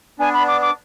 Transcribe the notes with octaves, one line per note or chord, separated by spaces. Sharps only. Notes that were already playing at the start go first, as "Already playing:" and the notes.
B3 D4 G#5
B5
D6
D6